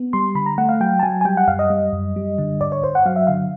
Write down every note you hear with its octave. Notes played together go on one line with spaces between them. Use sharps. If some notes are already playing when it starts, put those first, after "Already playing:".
Already playing: B3
G3 C6
D3 B5
A#5
A3 F#5
F5
F#3 G5
A5
F#3 G#5
G#5
G3 G5
F#5
F#2 F5
D#5
G3
F#2
G3
D3
G2 D5
C#5
G2 C5
F#5
F#3 F5
E5
D3 F5